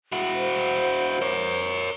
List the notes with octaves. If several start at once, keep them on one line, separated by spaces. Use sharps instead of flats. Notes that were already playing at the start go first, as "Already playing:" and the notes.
E4 F#4
C5
A#4 C#5